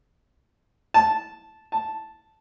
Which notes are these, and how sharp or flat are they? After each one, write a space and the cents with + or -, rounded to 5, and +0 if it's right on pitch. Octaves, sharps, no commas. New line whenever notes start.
A5 -10
A5 -5